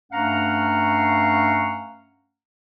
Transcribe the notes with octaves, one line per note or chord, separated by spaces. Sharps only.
G2 A3 C#4 F5 F#5 A#5